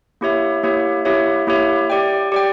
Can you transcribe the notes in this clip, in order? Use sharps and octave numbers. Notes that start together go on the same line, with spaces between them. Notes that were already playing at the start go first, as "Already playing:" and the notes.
A#3 E4 G4 C#5 E5
A#3 E4 G4 C#5 E5
A#3 E4 G4 C#5 E5
A#3 E4 G4 C#5 E5
G4 D5 G5
G4 D5 G5